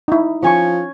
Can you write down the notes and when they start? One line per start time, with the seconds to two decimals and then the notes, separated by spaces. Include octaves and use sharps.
0.08 D#4 E4
0.42 F3 C#4 G#5 C#6